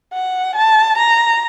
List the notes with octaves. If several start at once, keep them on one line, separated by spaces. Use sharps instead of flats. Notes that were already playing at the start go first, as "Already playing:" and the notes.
F#5
A5
A#5